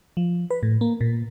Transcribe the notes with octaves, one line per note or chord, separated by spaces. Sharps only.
F3
B4
A2
A#3
A#2